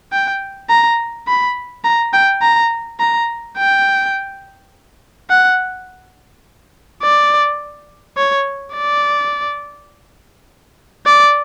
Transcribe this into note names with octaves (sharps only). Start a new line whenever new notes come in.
G5
A#5
B5
A#5
G5
A#5
A#5
G5
F#5
D5
C#5
D5
D5